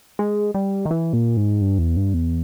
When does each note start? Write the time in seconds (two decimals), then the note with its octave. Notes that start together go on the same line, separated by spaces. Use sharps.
0.19 G#3
0.54 G3
0.86 D#3
0.91 E3
1.13 A#2
1.37 G#2
1.61 G2
1.78 E2
1.97 G2
2.14 E2